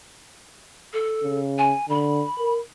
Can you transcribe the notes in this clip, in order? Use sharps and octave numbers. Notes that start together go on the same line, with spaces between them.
A4
C#3
G#5
D3 B5
A#4